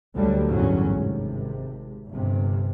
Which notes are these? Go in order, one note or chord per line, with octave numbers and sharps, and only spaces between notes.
D2 D3 F#3 G3
A1 E2 G2 D3 F#3 C#4
G#1 C3
G1 G2 C3